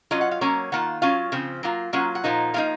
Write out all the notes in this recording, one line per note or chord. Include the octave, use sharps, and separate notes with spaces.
F#3 C#4 F4 D#5
F#5
F5
F#3 A#3 C#4 C#5
D#3 A#3 F4 F#5
F#3 C#4 F4 F5
C#3 F3 C4
F#3 A#3 F4
F#3 A#3 C#4 F4 F#5
F#5
A#2 F3 A#3 D#4
F3 A#3 D#4 F5